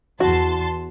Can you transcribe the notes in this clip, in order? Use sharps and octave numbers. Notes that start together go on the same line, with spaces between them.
E2 F#4 A5 C6